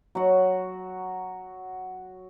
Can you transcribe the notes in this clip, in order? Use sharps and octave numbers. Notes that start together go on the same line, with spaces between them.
F#3 F#4